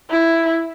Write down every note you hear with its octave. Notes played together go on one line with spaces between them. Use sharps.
E4